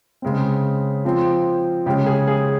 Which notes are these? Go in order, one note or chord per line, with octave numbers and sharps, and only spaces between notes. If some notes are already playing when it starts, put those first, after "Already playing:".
C#3 G#3 C4
F3 C4
C#3 G#3 C#4 G4
G#4
G#4